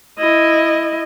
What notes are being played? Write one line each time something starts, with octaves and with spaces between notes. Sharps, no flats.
E4 D#5